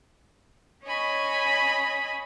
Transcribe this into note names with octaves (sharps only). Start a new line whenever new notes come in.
C#4 C#5 D#5 G#5 B5